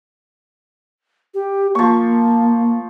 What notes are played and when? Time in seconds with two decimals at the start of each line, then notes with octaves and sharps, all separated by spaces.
1.34 G4
1.75 F3 A#3 C#6